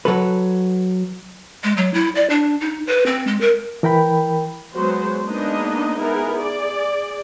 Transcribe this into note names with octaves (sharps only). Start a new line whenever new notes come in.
F#3 A4 B4
G#3
F#3
E4
D5
D4
D#4
B4
C4
G#3
A#4
E3 A#4 G5 B5
F#3 G#3 B3 F#4 C5
G#3 A#3 B3 D4 D#4 D#5
B3 D#4 E4 G#4 A#4
G#4 D5